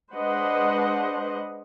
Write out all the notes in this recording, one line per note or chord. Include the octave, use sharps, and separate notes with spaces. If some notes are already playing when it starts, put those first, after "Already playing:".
G#3 D4 B4 C5 D#5 F#5